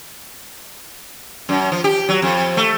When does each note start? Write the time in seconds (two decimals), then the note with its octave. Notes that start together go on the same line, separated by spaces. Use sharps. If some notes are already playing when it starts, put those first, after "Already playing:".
1.49 F#2
1.72 F3
1.84 G4
2.09 F#3
2.22 F2
2.57 A3